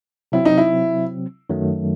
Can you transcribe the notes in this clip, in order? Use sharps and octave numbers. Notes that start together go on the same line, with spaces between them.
C3 F#3 C4 E4
D#4
E4
F#2 D#3 F#3 A3